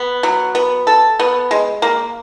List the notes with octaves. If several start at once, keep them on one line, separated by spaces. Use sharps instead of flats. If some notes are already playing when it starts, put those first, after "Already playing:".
Already playing: B3
F#3
B3
A4
B3
G#3
A#3